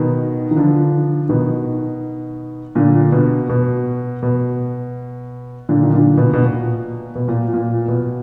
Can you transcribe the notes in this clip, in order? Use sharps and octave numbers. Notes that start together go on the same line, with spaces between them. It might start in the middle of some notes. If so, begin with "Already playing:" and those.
Already playing: B2 D#3
D#3
D3 F3
B2 D#3
A#2 D3
B2
B2
B2
A#2 D3
D#3
A#2 D3
B2
B2
A#2
B2
A#2
A#2
B2